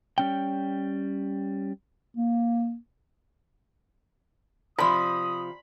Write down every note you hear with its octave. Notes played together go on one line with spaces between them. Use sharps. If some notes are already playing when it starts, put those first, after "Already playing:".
G3 C#4 G5
A#3
C3 F3 D5 B5 C6 D#6